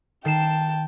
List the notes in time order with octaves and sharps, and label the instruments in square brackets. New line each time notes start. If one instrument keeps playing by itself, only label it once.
[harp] D#3 C7 E7 [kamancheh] G5 A5